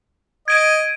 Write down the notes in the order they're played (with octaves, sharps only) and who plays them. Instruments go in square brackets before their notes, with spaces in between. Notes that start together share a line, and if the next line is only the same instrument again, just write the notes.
[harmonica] D#5 [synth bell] G#6 D7 D#7